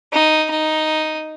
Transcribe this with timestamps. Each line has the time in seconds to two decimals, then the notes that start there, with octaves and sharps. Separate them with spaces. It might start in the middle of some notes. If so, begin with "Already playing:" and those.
0.13 D#4
0.50 D#4